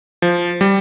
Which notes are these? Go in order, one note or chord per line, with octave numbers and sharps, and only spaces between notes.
F3
G3